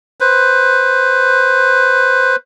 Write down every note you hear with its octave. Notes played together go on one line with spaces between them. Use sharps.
B4 C5